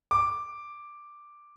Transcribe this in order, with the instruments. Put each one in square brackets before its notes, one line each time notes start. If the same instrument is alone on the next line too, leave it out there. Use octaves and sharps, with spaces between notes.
[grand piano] D6